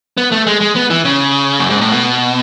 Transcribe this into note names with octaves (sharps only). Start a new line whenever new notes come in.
B3
A3
G#3
G#3
B3
E3
C#3
F#2
G#2
A2
B2